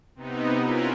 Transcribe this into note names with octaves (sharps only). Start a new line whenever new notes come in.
C3 B3 D#4
C#4 E4 F4 A#4 B4